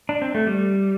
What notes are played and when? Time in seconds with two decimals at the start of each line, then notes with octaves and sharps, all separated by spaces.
0.09 D4
0.22 C4
0.35 A3
0.47 G3